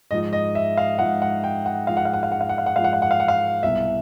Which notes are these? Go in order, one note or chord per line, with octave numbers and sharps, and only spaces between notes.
G#2 F3 D#5
D#5
E5
F5
G#2 F3 F#5
F#5
G5
F#5
G#2 F3 F5
F#5
F5
F#5
F5
F#5
F5
F#5
F5
F#5
G#2 F3 F5
F#5
F5
F#5
F5
F#5
F5
C2 B2 E5